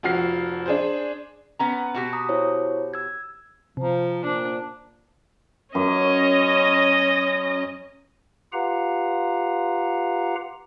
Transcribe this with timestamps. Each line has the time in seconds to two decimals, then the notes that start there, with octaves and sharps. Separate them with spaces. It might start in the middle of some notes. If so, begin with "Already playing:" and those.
0.03 F1 F3 F#4 F6 C7
0.66 D4 G#4 C5
1.59 B3 C#4 A#5
1.94 B2 F#4 G4
2.13 A#5 D#6
2.29 E4 C5 C#5
2.94 E6 G#6
3.77 C3 F3 C5 A5 A#5
4.23 A#2 D4 C5
5.75 F#2 C#4 D#5
8.53 F4 G4 B4 F5 F#5 A#5